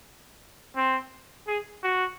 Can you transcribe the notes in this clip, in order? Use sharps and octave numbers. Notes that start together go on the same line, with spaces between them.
C4
G#4
F#4